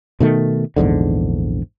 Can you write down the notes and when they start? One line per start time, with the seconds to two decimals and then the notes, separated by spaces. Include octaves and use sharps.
0.20 B2 D#3 A3
0.76 A#1 E2 G#2 D3